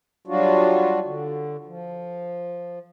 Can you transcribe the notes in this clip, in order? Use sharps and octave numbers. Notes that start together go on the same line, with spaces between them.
F#3 G3 D4 F4 F#4
D3
F3